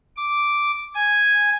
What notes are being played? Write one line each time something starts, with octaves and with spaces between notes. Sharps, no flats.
D6
G#5